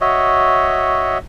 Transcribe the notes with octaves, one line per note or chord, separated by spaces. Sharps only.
F#4 C#5 D#5 E5